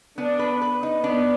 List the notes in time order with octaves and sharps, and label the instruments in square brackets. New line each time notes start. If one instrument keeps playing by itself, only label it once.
[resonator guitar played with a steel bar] B3 [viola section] D4
[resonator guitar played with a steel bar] B4
B4
D#4
[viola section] B3 [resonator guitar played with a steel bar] D4